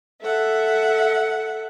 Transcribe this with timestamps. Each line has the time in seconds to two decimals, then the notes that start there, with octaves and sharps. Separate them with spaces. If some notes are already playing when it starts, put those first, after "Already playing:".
0.21 A4 E5 F#5